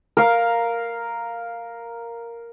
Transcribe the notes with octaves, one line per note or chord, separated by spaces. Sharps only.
A#4 F5